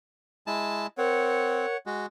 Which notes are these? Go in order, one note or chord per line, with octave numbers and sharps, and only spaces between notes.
G#3 E4 A5
C4 A#4 C#5 F#5
G#3 F#4